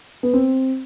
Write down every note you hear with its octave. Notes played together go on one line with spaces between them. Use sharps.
B3
C4